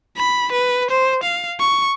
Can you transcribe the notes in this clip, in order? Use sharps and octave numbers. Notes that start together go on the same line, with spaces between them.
B5
B4
C5
F5
C#6